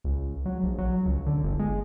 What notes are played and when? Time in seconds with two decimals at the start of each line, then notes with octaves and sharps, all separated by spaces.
0.04 C#2
0.46 F#3
0.63 A#1
0.78 F#3
1.06 C#2
1.26 D3
1.43 G1
1.59 G#3